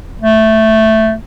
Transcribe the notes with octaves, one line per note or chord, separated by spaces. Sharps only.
A3